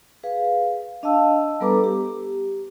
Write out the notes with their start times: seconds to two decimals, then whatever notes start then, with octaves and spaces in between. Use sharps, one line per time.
0.23 G#4 B4 F5
1.03 D4 D#5 F5 A5 E6
1.60 G3 B3 A4 B4 A#5 D6
1.84 G4